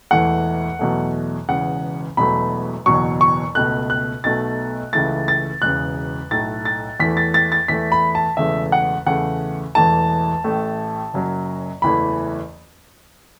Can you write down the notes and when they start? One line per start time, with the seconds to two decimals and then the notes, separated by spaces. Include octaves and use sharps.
0.11 E1 E2 E3 A3 F#5
0.79 E2 B2 F#3 A3
1.49 E1 E2 C#3 F#5
2.17 E1 E2 B2 F#3 A3 B5
2.86 F#1 E2 B2 F#3 C#6
3.21 C#6
3.55 C#2 B2 A3 F#6
3.90 F#6
4.24 B1 B2 A3 A6
4.93 C#2 C#3 E3 A3 A6
5.28 A6
5.62 E1 E2 C#3 F#6
6.31 B1 A2 A3 A6
6.65 A6
7.00 E2 E3 A3 B6
7.17 A6
7.34 A6
7.52 A6
7.68 E2 E3 A3 B6
7.92 B5
8.15 A5
8.37 E1 E2 C#3 A3 E5
8.72 F#5
9.06 E2 C#3 A3 F#5
9.75 E1 E2 E3 A3 A5
10.44 A1 A2 A3
11.13 F#1 F#2 F#3
11.82 F#1 E2 E3 A3 B5